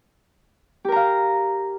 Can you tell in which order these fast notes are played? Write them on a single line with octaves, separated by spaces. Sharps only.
G4 A#4 A#5 F5